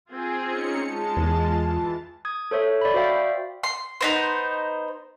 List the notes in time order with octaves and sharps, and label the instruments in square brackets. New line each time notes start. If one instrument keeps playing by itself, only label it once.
[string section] C4 F4 G#4
[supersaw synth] C#4 D#4 C#7
[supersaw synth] G#3 [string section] F4 A5
[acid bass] E2
[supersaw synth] E3
[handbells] D#6 G#6
A4 C5 C#5 E5
D5 B5
F#4 C5 D5 E5 F5 G5
[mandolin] C6
B3 D#4 C5